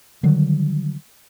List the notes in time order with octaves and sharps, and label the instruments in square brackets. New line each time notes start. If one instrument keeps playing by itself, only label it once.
[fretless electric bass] D3 D#3 F#3 G3